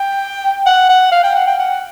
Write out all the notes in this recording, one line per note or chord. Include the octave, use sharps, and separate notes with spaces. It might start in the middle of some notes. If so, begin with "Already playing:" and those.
Already playing: G5
F#5
F#5
F5
G5
F#5
G5
F#5